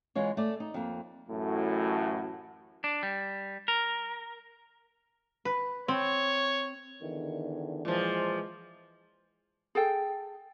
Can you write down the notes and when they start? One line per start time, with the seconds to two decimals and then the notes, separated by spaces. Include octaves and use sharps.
0.15 E3 G#3 F4 C#5
0.37 A3 D5
0.60 D#4
0.74 F2 A#3
1.28 A1 F#2 A2 A3 E4 F#4
2.84 D4
3.03 G3
3.68 A#4
5.45 B4
5.88 C4 C#5
7.01 E2 D3 D#3
7.85 A#2 E3 F3 G#3
9.75 G#4 A4 G5